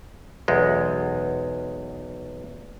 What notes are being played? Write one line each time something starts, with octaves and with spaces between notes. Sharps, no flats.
B1 E2 G#3